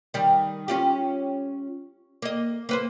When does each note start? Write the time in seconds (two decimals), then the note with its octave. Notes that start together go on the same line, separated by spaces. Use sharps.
0.14 D#3 G3
0.68 C#4 F4 G4
2.22 A#3 D#5
2.69 A#3 B4 C5